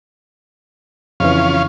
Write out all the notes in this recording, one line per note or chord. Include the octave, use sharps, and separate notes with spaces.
F2 C#3 E3 C#4 F4 F5